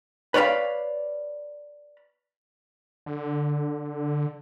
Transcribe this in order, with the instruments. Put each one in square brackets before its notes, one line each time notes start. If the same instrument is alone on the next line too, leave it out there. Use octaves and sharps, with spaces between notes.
[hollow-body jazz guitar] B4 C#5 D5 F5 B5
[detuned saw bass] D3